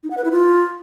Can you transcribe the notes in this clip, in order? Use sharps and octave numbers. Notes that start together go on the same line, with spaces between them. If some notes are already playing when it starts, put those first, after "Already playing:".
D#4
F#5
B4
E4
F4